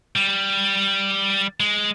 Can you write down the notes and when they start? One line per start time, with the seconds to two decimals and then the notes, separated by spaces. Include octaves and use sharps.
0.16 G3
1.60 G#3